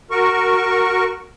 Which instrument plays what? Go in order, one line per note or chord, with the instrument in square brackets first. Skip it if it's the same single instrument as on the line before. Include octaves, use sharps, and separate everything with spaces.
[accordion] F#4 A#4 C#6